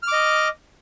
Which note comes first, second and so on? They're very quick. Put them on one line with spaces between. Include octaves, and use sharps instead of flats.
F6 D6 D#5